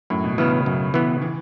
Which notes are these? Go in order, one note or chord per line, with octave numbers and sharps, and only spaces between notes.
F#2 A2
B2
C#3 E3 B3
C#3
F#2
E3 B3
E3